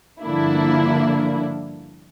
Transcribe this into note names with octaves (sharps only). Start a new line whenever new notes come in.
G2 D3 F3 A#3 D4 E4